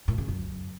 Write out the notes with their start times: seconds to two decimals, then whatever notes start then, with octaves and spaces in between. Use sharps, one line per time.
0.08 A2
0.18 C#3
0.28 F#2